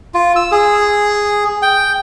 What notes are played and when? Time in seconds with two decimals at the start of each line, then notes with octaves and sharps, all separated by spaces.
0.14 F4
0.36 E6
0.52 G#4
1.62 G5